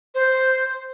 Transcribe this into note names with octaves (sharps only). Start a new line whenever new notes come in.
C5